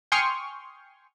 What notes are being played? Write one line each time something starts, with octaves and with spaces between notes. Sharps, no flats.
G5 G#5 C6 C#6 D#6 F6